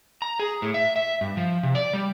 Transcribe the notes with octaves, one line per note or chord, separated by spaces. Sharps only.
A#5
G#4
A2
E5
E5
G2
F3
C3
D5
G3